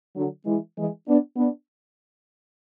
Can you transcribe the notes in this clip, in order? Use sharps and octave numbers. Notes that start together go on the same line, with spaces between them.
D3 F#3
E3 G#3
E3 G#3
B3 D4
B3 D4